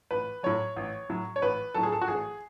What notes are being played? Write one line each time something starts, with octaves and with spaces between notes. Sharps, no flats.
A1 B4
A2 F#3 C#5
A1
A2 F#3
C#5
A1 B4
A2 F#3 A4
G#4
A4
F#4
A1 G#4